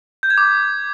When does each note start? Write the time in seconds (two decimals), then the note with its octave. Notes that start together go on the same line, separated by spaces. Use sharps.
0.23 G6
0.30 G#6
0.38 D6